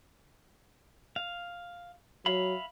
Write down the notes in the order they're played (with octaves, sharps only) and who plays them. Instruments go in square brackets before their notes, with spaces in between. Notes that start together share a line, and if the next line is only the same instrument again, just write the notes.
[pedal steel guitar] F5
[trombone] F#3 [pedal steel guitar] E5 F5 B5